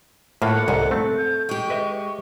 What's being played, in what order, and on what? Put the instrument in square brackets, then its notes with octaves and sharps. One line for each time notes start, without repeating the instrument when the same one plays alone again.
[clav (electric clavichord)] A2 A#3 F4 [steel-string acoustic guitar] A4 [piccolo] F#5
[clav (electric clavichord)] C2 G#2 G#5 [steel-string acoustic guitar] A4
[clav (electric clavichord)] A3 C4
[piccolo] G6
[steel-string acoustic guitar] G#3 G4 [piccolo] C#6
[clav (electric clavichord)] B4 D#5 E5